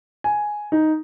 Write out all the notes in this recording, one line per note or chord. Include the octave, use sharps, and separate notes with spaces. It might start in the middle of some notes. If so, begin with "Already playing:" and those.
G#5
D#4